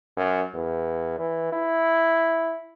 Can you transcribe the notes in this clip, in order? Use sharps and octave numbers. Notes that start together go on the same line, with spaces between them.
F#2
E2
E3
E4